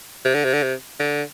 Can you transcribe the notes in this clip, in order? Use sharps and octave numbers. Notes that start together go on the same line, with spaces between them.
C3
D3
C3
D3
C3
D3